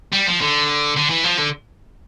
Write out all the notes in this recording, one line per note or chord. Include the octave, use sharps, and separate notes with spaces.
G3
F3
D3
D3
E3
F3
D3